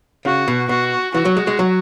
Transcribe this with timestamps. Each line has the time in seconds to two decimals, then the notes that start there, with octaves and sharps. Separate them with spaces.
0.25 C#3 F#4
0.48 B2
0.69 B2 F#4
1.14 E3 F#4
1.25 F#3
1.37 G#3
1.47 G#3
1.59 F#3